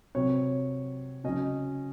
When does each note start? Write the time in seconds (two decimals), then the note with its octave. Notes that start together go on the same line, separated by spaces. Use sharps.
0.15 C3 F#3 C4 C#5
1.24 C#3 F#3 C#4 D#5